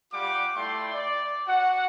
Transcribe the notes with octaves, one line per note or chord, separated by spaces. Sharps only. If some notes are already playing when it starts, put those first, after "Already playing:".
G3 F4 G4 F#5 D6
A3 E4 D5 G5 C6
D5
F#4 F#5